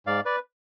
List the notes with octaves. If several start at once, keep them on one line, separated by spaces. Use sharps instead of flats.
G#2 D5 F5
B4 D5